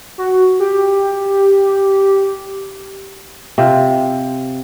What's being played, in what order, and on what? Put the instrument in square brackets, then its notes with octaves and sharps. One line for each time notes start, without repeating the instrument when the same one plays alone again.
[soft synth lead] F#4
G4
[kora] C3 F4